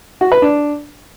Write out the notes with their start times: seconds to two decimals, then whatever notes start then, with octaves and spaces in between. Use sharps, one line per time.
0.21 F#4
0.32 B4
0.42 D4